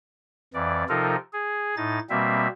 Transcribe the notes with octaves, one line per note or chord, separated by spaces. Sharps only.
F2 E3 D5
C3 F3 D#4 F4 A4 A#4
G#4
A2 D#4 A6
B2 G3 A#3 C4 E5